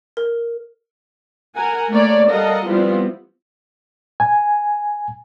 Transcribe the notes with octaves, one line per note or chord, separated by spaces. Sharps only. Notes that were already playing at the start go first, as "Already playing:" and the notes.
A#4
A#4 F#5 G#5
A3 A#3 C#5 D5
G3 A4 A#4 D#5 F5 F#5
F3 G3 B3 C4 E4 F4
G#5